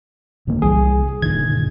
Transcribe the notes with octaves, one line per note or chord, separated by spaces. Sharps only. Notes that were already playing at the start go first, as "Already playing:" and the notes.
D#1 D3 A#3
C2 E3 G3 G#4
F#1 A#2 D3 D#3 G#6